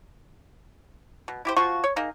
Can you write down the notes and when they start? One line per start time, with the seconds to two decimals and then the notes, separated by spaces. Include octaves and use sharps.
1.28 B2
1.45 E4 G4 C5
1.56 F3 F4 F#4 C#6
1.84 C#5
1.96 A#3 D#4 G#4